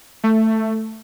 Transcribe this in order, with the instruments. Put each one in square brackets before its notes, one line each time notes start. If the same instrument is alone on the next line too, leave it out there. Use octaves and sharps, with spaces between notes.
[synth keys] A3